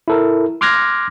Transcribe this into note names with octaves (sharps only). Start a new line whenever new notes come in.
E4 A4 A#4
C6 D6 F6 F#6 G#6 A#6